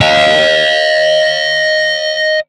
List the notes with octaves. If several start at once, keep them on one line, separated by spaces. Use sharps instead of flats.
D#5 F5